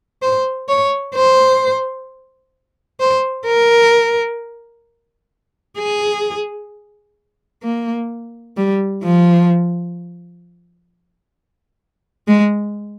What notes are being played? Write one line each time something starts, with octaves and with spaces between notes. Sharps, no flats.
C5
C#5
C5
C5
A#4
G#4
A#3
G3
F3
G#3